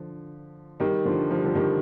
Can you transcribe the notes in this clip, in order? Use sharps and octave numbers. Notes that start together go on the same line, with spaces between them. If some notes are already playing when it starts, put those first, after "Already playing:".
Already playing: D3 F3
D#3 G3
D3 F3
F3
G3
D3 F3
D#3 G3